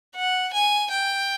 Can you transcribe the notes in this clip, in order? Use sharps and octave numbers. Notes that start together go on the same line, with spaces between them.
F#5
G#5
G5